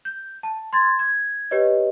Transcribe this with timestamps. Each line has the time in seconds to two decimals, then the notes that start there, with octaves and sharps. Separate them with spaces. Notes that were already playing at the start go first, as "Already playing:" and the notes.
0.05 G6
0.43 A5
0.73 C6 G#6 A6
0.99 G#6
1.51 G4 B4 C#5 D#5